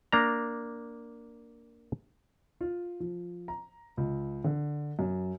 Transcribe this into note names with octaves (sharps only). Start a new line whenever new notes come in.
A#3 D4 A#5
F4
F3
A#5
C#2
D3
F#2